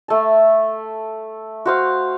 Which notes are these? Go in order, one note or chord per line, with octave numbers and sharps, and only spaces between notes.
A3 A5
F#4 C5 F5